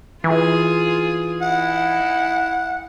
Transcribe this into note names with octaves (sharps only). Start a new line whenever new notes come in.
E3 F4 G#4
D#4 E4 F#5